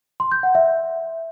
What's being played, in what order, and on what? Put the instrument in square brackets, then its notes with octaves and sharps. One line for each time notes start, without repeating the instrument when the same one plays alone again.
[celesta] C6
G6
F#5
E5